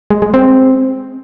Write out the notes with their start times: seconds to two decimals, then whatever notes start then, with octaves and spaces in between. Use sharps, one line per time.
0.10 G#3
0.22 G#3
0.34 C4